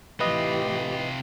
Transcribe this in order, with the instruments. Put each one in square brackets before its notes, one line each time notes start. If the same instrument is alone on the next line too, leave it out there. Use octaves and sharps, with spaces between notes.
[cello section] A2 E3 G4 [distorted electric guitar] C3 F4 [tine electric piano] B4 D#5